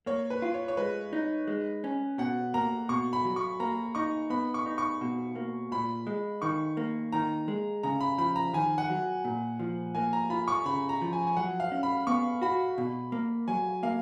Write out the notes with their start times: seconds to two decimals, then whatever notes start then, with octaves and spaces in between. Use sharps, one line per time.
0.06 A#3 C#5
0.30 B4
0.42 F4
0.54 C#5
0.68 C#5
0.77 G#3 B4
1.13 D#4
1.47 G#3
1.84 C#4
2.18 B2 F#5
2.54 A#3 A#5
2.89 B2 C#6
3.13 B5
3.24 F#3
3.36 C#6
3.60 A#3 A#5
3.95 D#4 C#6
4.30 B3 B5
4.54 C#6
4.66 D#4
4.78 C#6
5.01 B2
5.36 A#3
5.72 A#2 B5
6.07 G#3
6.42 D#3 C#6
6.77 A#3
7.12 D#3 A#5
7.48 G#3
7.83 C#3 A#5
8.01 B5
8.18 F3 B5
8.36 A#5
8.53 D#3 G#5
8.78 F#5
8.90 F#3
9.25 A#2
9.60 F3
9.95 A#3 G#5
10.13 A#5
10.30 F4 B5
10.48 C#6
10.65 C#3 B5
10.89 A#5
11.02 F3
11.13 G#5
11.27 G#5
11.37 F#3 F#5
11.60 F5
11.72 C#4
11.83 B5
12.07 B3 C#6
12.42 F#4 B5
12.78 B2
13.12 A#3
13.48 F#3 G#5
13.83 A#3 F5